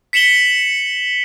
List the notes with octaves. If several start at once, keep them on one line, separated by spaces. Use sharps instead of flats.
B6 C#7 E7 F#7 G7